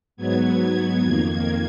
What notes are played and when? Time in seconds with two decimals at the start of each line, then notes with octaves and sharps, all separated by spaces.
0.17 G#2 F#3 B3 G#6
0.58 G#6
1.00 F2 D#3 A#3